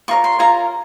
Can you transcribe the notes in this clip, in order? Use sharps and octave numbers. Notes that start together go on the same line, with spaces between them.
F4 A#4 C#5 C#6
C6
F4 A#4 C#5 A#5